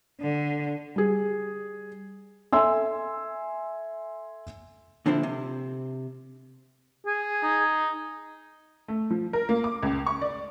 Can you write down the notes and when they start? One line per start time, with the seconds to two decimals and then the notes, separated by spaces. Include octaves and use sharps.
0.21 D3
0.96 G3 G#4
2.53 A4 E5 G#5 C6 E6
5.06 A#2 D3 F3 C4 E4
5.23 C3
7.06 G#4
7.43 D#4
8.88 A3
9.11 F3
9.33 A#4
9.49 A#3
9.64 D6
9.83 C#2
10.06 C#6
10.22 D5